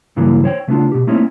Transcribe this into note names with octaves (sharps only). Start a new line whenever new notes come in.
G2 C#3 E3 F#3 A#3 C#4
C5 C#5 G5
C#3 A3 B3 C#4 D4 F4
B2 G4
A3 A#3 C4 C#4 D#4 E4